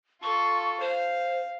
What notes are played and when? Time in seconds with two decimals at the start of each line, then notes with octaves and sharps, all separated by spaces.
0.23 F4 A4 C#6
0.81 C5 F5